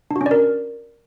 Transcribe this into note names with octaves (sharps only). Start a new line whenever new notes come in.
D4
F#4
C#4
D5
A#4